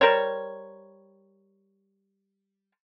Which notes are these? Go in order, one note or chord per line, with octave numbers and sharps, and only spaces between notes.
G3 A#4 C5 C#5